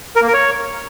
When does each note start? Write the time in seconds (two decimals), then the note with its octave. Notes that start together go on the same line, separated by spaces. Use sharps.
0.16 A#4
0.22 A#3
0.28 A#4
0.34 C#5